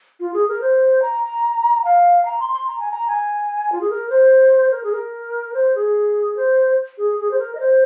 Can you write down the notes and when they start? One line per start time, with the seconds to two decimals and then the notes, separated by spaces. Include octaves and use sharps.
0.20 F4
0.34 G#4
0.49 A#4
0.61 C5
1.02 A#5
1.85 F5
2.25 A#5
2.40 C6
2.53 C6
2.67 A#5
2.79 G#5
2.91 A#5
3.08 G#5
3.72 F4
3.81 G#4
3.90 A#4
4.10 C5
4.71 A#4
4.84 G#4
4.92 A#4
5.54 C5
5.75 G#4
6.37 C5
6.98 G#4
7.19 G#4
7.31 C5
7.39 A#4
7.55 D#5
7.60 C5